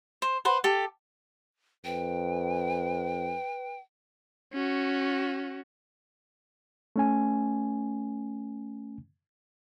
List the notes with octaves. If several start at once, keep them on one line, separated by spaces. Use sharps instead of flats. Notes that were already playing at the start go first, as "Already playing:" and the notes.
C5
B4 C5 F#5
G4 A4
F2 B4 G5
C#4 F#4
A3 C#4 G#5